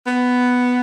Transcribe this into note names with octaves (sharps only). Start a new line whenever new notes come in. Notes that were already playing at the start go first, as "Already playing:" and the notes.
B3